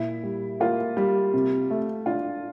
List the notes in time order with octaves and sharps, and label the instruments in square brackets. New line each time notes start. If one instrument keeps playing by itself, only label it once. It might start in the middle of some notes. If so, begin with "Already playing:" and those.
Already playing: [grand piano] A#2 [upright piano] E4
[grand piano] G3
[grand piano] A#3 [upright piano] F4
[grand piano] G3
C3
A3
[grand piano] D4 [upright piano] F4